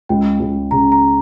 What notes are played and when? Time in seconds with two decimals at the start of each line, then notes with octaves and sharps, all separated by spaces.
0.09 C#2 G5
0.40 C#2
0.71 C#3 A#5
0.92 A#5